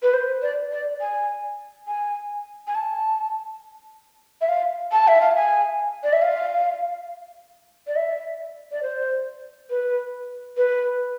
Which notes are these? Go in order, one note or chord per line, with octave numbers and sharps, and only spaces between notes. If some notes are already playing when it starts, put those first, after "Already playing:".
B4
C5
D5
D5
G#5
G#5
G#5
A5
E5
F5
A5
E5
F5
G#5
D5
E5
F5
D5
E5
D5
C5
B4
B4